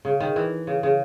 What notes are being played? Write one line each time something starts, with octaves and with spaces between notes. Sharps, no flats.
C#3
D#3
E3
C#3
C#3